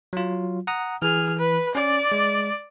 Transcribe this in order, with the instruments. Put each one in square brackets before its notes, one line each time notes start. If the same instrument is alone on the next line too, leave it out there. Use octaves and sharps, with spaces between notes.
[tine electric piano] F#3 F4
F#5 A#5 D#6
[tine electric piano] E3 [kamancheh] G#4 F6
[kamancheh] B4
[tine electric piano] C#4 [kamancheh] D5
[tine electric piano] G#3